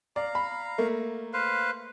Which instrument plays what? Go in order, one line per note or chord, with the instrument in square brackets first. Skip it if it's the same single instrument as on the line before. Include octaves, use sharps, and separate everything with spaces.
[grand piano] D5 [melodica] F5 A#5
[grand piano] B5
A3 A#3
[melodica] B4 C5 F5